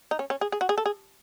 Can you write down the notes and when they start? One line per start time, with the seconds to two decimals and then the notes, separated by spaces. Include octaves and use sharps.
0.11 D#4
0.19 C#4
0.30 C#4
0.41 G#4
0.52 G#4
0.61 F#4
0.69 G#4
0.78 A4
0.86 G#4